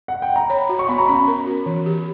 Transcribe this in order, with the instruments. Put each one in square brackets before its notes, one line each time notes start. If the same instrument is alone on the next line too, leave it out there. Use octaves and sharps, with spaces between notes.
[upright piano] F#5
G5
A#5
[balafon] C#5 [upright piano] B5
[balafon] F#4
[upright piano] C#6
[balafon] B3 [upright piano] B5
[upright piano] A#5
[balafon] C#4 [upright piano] B5
[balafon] A#4
F#4
E3
G4